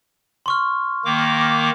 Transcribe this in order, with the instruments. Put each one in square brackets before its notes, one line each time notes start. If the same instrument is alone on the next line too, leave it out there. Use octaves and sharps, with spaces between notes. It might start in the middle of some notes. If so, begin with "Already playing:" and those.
[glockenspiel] C6 C#6 F6
[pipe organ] D#3 A#3 D6